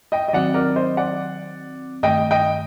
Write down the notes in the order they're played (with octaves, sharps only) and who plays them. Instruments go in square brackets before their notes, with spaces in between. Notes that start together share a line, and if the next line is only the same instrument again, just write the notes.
[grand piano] D#5 G5
D#5
[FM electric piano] D#3 F#3 C4 [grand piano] D5 F#5
[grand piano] A#4 D5
C5 D#5
D5 F#5
[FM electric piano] G2 D#3 A3 [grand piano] D#5 G5
[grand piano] D#5 G5